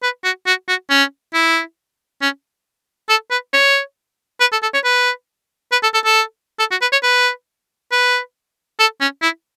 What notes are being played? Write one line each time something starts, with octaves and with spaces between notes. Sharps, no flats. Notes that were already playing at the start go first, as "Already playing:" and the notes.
B4
F#4
F#4
F#4
C#4
E4
C#4
A4
B4
C#5
B4
A4
A4
C#5
B4
B4
A4
A4
A4
A4
F#4
B4
C#5
B4
B4
A4
C#4
E4